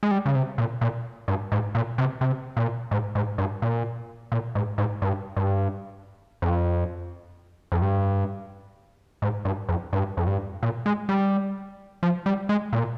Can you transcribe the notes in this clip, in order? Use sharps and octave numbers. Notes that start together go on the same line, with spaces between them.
G#3
G3
C#3
C3
A#2
A#2
G2
G#2
A#2
C3
C3
A#2
G#2
G#2
G2
A#2
A#2
G#2
G#2
G2
G2
F2
F2
G2
G#2
G2
F2
G2
F2
G2
A#2
G#3
G3
F3
G3
G#3
A#2